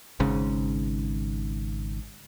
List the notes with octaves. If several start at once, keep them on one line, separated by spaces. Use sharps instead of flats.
G#1 G#2 C#3